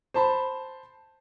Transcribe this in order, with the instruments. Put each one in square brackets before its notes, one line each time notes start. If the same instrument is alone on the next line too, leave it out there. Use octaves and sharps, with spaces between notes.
[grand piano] C5 A5 B5